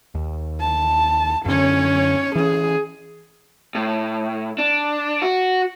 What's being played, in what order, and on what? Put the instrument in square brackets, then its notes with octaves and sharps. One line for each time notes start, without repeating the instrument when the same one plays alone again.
[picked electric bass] D#2
[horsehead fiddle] A5
[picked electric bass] F#2 D3 [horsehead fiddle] C#4 C#5
[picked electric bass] E3 C#4 [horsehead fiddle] G#4
[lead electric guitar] A2
D4
F#4